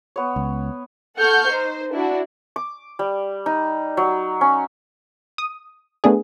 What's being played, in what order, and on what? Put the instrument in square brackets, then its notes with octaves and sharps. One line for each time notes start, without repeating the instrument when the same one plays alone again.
[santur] B3 C#5
[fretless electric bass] C#2
[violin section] A4 F#5 C#6 F6 G6
D#4 C5
D4 E4 F#4
[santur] D6
G3
D#4
F#3
C#4
[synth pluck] D#6
A3 B3 D4 G#4